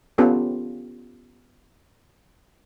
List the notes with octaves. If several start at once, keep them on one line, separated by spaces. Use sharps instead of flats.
B3 C#4 F4 G4 A4